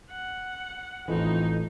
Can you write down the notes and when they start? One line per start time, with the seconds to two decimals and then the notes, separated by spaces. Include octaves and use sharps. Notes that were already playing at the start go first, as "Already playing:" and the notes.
0.10 F#5
1.08 A1 F2 E3 D#4